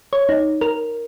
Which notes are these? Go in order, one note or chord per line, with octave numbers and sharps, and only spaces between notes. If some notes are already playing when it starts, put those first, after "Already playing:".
C#5
D#4
A#4